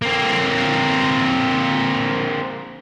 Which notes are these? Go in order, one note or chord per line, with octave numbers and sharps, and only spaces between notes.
A#3 C4